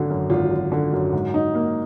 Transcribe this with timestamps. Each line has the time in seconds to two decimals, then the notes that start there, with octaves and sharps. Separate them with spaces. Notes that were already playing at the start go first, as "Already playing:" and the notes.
Already playing: G#1 D3 F#3
0.10 F#2
0.30 G#1 F4
0.50 F#3
0.72 D3
0.93 F#2
1.13 G#2
1.34 D#4
1.55 A#3